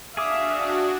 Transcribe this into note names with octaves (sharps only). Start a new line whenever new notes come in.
D4 F#4 G#4 E5 F5 D6 D#6